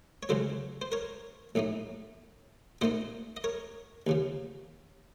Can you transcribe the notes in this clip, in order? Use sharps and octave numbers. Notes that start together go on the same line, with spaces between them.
C#5
C#2 C#3 F#3 A4 C5
C5
A#4 C#5
A#1 A2 A3 D#4
A#2 A3 C4 D#4 C5 D#5
D#5
A#4 C#5
D#2 C#3 F3